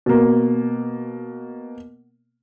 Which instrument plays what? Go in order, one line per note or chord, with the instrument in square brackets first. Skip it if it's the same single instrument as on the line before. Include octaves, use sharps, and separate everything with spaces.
[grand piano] B2 A#3